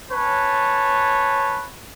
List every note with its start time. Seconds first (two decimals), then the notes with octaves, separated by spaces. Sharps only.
0.10 C#4 B4 C#5 A5